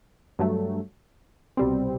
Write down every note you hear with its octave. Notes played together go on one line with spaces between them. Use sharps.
G2 F#3 A3
C2 B2 G3 C4